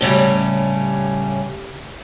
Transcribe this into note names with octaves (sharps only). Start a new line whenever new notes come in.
A2 C#3 G3 C#4